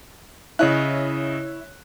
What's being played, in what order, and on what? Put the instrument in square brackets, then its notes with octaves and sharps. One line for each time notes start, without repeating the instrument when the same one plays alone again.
[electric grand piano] C#3 D#5 F#6 [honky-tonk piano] E4 C#5